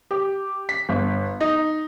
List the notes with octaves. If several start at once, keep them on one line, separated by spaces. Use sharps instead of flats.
G4
B6
G1
D#4